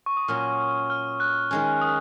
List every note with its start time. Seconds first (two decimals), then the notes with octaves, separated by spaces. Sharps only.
0.06 C#6
0.17 D#6
0.28 A#2 F#3 C#4 F6
0.90 F6
1.20 F#6
1.51 D#3 G#3 C#4
1.81 D#6